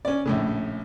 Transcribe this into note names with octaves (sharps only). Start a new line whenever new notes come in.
C#4 D5
A#1 A2 C#3